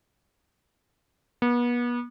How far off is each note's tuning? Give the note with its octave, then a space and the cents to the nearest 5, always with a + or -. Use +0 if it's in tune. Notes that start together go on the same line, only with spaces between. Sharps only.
B3 -35